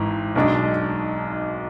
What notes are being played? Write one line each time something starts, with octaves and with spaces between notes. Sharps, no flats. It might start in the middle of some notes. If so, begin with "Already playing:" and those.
Already playing: G#1 G#2 E3
B1 B2 G#3 D4